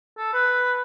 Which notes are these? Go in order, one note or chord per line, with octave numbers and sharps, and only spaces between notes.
A4
B4